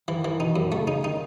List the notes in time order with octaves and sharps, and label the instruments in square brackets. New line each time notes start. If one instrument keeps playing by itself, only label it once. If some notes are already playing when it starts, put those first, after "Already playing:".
[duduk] D#3 [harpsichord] E3
[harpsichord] E3
[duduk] B2 [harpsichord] D#4
[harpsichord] F#2
[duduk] C#3 [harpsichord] A3
[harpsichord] D#4
[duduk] D#3 [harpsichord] D#4